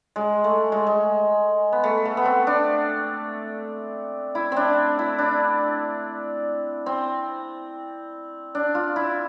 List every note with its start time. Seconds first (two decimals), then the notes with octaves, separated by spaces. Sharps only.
0.16 G#3
0.44 A3
0.72 G#3
0.87 G#3
1.73 B3
1.84 A3
2.05 A3
2.17 B3
2.25 C4
2.47 D4
4.35 E4
4.52 C4 D4
4.99 E4
5.18 D4
6.86 C4
8.55 D4
8.75 F4
8.96 E4